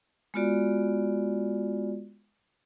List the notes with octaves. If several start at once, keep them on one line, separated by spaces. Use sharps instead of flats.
G#3 B3 F4 F#4 D5